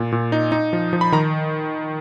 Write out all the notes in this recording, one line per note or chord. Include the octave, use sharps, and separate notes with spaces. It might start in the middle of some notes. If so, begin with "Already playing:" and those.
Already playing: A#2
A#2
D#4
D#4
F3
F3
B5
D#3 A#5